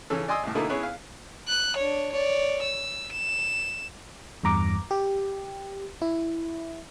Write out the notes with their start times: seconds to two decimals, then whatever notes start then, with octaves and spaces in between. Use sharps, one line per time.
0.10 C#3 E3 C#4 A4
0.28 D5 D#5 G#5 C6 D#6 E6
0.43 C2 A2
0.55 B2 D3 A3 A#3 D#4 E4
0.69 B3 C#4 E4 G#4 C#5
0.83 F5
1.48 F#6
1.77 D4 C#5
2.13 C#5 D5
2.62 E6
3.12 E7
4.44 E2 G2 A#5 D6
4.91 G4
6.02 E4